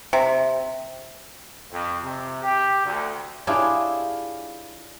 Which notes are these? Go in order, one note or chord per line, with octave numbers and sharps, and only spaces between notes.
C3
F2
C3
G4
D2
D4 E4 F4 G4 G#4 C#5